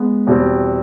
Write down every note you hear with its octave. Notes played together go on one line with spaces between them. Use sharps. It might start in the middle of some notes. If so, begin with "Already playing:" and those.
Already playing: G#3 B3
E2 B2 G3 C4